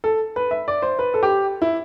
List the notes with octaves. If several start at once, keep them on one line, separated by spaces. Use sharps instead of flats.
A4
B4
E5
D5
C5
B4
A4
G4
E4